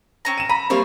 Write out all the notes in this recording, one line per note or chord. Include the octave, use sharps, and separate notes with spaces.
C4 C#4 A#5
D#7 E7
A#5 B5 D#7
G3 A#3 C4 E4 C#5 F5